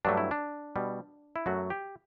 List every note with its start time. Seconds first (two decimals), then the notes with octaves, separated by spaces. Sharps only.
0.05 G2 F#3 A3 D4
0.17 E4
0.31 D4
0.76 B2 G3
1.36 E4
1.46 F#2 F#3 A3 F#4
1.70 G4